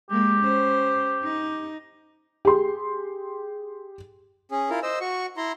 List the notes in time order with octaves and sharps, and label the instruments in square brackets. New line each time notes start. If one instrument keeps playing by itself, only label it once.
[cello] G#3 A#3 [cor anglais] G4
[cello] C#4 C5
D#4
[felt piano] G4 G#4 C6
[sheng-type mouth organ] C#4 G#4
E4 F4 A#4
C5 D#5 E6
F#4 C#6
E4 A#5 C6